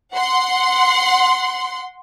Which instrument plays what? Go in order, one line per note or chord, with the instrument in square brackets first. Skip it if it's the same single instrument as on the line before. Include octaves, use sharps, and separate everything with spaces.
[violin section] F#5 C6